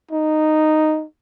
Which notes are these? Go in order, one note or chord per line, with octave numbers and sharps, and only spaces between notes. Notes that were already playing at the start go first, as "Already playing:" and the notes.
D#4